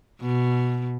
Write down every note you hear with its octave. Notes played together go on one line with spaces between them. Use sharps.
B2